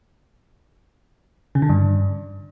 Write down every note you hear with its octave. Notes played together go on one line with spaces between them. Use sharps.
C#3
D3
G2